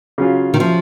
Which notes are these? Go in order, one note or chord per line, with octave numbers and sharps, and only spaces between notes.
C#3 F#3 C#4 F4
D#3
F3